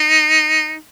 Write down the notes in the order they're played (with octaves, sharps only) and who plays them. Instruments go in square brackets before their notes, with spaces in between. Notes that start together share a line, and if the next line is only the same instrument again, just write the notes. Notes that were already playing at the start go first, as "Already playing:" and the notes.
Already playing: [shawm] D#4